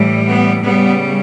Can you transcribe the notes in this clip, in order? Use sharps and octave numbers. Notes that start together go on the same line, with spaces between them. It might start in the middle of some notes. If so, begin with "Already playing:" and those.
Already playing: A2 E3 G3
B3
C#3 G3 B3